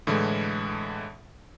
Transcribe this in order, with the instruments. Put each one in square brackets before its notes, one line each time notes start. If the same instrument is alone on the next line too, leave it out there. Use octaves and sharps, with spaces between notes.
[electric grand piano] A2 D3 E3 G#3